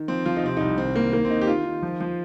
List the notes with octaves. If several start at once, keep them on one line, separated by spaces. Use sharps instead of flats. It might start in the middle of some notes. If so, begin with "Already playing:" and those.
Already playing: D#3
F3 C4
F3 F4
D#4
C3 C4
C2 D#4
D#3 C4
D#3 A#3
D#3 A#3
C4
D#3 D#4
G4
D#3 F4
D#3
F3
F3